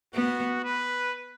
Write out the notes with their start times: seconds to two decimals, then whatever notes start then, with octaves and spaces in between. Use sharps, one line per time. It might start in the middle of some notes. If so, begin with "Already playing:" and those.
0.14 B3 F#4
0.65 B4